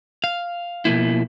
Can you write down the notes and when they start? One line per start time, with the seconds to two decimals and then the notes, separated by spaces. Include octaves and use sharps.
0.24 F5
0.85 B2 F3 A#3 E4